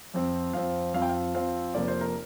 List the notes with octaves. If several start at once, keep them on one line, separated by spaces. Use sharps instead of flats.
F2 F3 C4
F2 F3 C4 F5
F2 F3 C4 F5
G5
F5
F2 F3 C4 F5
F1 F2 F3 A#3 D5
C5
A#4